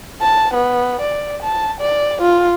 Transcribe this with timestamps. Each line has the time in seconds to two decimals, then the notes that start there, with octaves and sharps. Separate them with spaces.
0.22 A5
0.54 B3
1.01 D5
1.43 A5
1.81 D5
2.22 F4